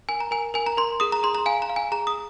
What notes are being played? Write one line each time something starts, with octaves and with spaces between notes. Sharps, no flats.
A#4 G#5
A#5
A#4 G#5
A#4 G#5
A#5
A#4 C6
G#4 D#6
A#5
G#4 C6
A#5
F5 G#5
A#5
F5
G#5
G#4 A#5
D#6